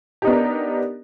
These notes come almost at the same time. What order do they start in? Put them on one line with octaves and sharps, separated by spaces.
G4 D#4 B3 D4 A#4